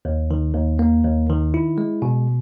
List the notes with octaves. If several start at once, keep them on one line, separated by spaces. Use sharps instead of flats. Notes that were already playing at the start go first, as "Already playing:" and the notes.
D#2
D#3
D#2
A#3
D#2
D#3
E4
G#3
B2